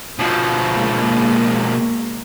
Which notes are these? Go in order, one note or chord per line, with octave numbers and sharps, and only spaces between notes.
B2 F3
G#3 A#3